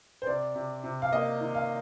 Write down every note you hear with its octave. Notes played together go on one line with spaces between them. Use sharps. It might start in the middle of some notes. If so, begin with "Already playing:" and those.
C5
C3 D5
C3
C3
F5
A#3 D#5
D#3
F5